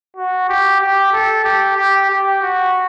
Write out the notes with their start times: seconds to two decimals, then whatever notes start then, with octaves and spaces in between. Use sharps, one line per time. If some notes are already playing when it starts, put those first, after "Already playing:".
0.17 F#4
0.49 G4
0.81 G4
1.13 A4
1.45 G4
1.77 G4
2.10 G4
2.42 F#4